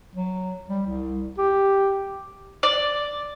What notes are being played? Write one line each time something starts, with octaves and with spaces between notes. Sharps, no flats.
F#3
G3
C2
G4
D5